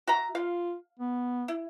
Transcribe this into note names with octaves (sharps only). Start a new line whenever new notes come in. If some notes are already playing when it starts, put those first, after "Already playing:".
F#4 E5 A#5
F4 F5
B3
E4